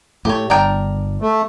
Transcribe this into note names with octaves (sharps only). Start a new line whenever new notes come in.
A2 A3 G4 C#5
G1 D4 A#4 G5
A3